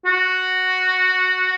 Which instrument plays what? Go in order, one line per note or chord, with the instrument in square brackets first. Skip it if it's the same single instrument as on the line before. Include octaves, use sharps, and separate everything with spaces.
[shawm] F#4